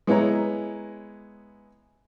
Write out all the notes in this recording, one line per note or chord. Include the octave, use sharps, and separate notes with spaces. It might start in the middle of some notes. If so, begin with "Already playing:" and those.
G#3 B3 E4 C#5 A#5